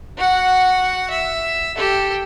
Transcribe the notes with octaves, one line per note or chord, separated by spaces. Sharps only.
F#4 F#5
E5
G4 A4